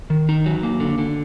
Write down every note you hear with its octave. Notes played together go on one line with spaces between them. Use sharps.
D#3
D#4
F#3
A#3
D3
D3